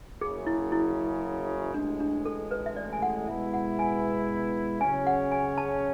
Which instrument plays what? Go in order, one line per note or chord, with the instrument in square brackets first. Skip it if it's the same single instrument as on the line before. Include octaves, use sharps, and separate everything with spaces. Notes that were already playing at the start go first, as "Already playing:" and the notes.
[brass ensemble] F#1 F#2 C#3 [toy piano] G#4
[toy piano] E4
E4
[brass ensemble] A1 A2 G#3 [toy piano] D4
[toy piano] D4
A4
B4
E5
D5
G#5
F#5
[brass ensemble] B2 G#3 B3 E4 [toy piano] E5
[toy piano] F#5
G#5
[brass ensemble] C#3 F#3 C#4 [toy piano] G#5
[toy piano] F#5
G#5
A5